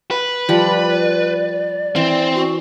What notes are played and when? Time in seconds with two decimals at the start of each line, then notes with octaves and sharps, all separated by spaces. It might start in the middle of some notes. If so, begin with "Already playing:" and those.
0.11 B4
0.49 F3 G3 D5
1.96 E3 C4
2.35 F#4